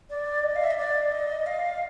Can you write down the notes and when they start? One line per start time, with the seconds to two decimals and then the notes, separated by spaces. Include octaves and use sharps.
0.10 D5
0.43 D#5
0.56 F5
0.63 E5
0.71 D#5
0.78 D5
1.12 D#5
1.46 F5